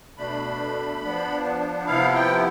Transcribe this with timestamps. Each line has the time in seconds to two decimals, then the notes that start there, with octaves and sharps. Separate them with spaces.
0.18 B2 A3 D4 B5
1.02 F3 B3 D4
1.86 C3 F3 B3 E4 F5
2.14 G5